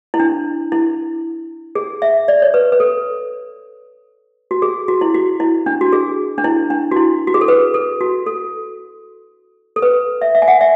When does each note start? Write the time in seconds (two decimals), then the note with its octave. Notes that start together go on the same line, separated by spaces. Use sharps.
0.14 E4
0.20 D4
0.72 E4
1.75 G#4
2.02 E5
2.28 D5
2.42 C#5
2.54 B4
2.72 B4
2.80 A4
4.51 F#4
4.62 G#4
4.88 F#4
5.01 E4
5.14 F#4
5.40 E4
5.66 D4
5.81 F#4
5.93 G#4
6.38 D4
6.44 E4
6.70 D4
6.91 F#4
6.96 E4
7.27 F#4
7.34 G#4
7.41 A4
7.48 B4
7.74 A4
8.01 F#4
8.27 A4
9.76 A4
9.82 B4
10.21 E5
10.35 E5
10.42 G#5
10.48 F#5
10.61 E5